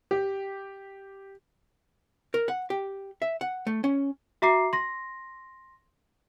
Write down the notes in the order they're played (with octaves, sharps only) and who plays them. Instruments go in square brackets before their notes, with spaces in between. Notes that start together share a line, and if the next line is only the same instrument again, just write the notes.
[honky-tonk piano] G4
[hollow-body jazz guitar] A#4
F#5
G4
E5
F#5
A3
C#4
[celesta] F#4 E5 A#5 D6 C7
C6 A#6